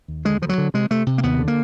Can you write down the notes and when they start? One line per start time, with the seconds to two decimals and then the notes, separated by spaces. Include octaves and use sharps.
0.08 D#2
0.25 D3 G#3
0.42 D2 F3
0.49 F#3
0.58 D3
0.74 C3 G#3
0.91 C3 A3
1.06 C3
1.18 A#3
1.23 D#2 B3
1.39 D3
1.48 A#3